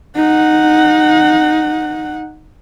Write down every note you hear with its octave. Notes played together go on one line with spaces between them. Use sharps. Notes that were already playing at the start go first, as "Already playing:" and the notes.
D#4 F#5